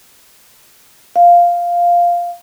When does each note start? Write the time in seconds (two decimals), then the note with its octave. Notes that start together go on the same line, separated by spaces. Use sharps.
1.16 F5